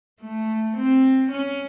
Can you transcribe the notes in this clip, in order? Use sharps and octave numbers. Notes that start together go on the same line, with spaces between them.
A3
C4
C#4